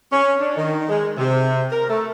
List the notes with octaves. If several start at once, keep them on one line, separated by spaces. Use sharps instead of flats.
C#4
D4
D#3
G#3
C3
A#4
A3